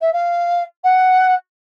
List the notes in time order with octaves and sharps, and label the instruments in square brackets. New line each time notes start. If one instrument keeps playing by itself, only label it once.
[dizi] E5
F5
F#5